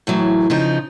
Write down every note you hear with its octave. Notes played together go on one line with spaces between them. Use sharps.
A2 E3 F#3
C#3 F3 D#4